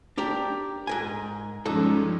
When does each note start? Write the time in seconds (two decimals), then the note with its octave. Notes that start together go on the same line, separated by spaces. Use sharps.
0.18 D4 G4 A#4
0.87 G#2 A#4 G#5
1.66 G2 F3 G#3 C#4 D#4 A4